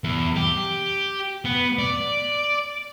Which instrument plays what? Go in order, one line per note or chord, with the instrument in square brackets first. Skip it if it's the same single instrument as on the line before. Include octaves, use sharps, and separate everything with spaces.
[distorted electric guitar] E2
G4
B3
D5